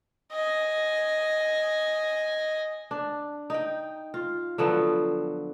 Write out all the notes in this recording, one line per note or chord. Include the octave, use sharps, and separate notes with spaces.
D#5 G#5
D4
D#4 G5
F4
D3 F3 F#3 B3